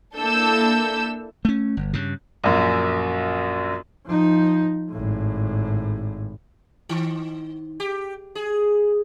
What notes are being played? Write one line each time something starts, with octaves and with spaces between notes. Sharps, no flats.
A#3 D4 E4 A4 E6 G6
A3 C#4
G1
G2 C#3
A#1 F#2
F3 D#4
G#1 A2
D#3
G4
G#4